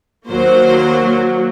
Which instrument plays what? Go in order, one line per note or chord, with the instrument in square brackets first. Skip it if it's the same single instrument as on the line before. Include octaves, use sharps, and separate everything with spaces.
[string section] D#2 C5 [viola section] F#3 A#3